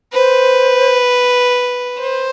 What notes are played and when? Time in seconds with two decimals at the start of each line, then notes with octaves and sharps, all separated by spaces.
0.13 B4 C5
2.00 C5